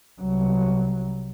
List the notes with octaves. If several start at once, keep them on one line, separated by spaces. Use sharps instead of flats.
C2 F#3